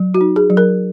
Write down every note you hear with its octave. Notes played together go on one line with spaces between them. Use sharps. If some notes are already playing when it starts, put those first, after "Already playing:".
Already playing: F#3
F#4
D#4
G#4
F#3
A#4